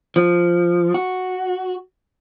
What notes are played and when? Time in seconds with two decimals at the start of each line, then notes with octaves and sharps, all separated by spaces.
0.16 F3
0.94 F#4